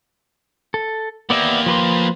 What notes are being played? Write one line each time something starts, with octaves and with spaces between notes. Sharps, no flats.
A4
A#3 B3 G4 D5 E5
F3 B4 C6